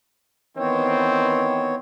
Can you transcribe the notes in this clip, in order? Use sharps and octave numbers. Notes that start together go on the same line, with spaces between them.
D#3 E3 B3 C4 C#5